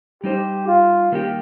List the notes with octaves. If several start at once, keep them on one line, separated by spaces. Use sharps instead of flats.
G3 D#4 G4 C5
F4
D#3 G3 A#3 D#4 G4